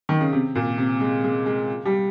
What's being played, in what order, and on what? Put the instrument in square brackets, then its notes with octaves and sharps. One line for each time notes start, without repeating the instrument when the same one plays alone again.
[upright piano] D#3
C#3
C3
A#2
C3
G#3
G#3
G#3
G3